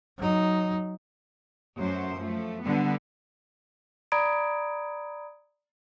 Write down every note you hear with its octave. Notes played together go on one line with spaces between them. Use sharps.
F#3 D#4
F#2 F#3 A3 C5
F3 A3
D3 G3 B3
D5 A#5 B5 D#6 G#6 D7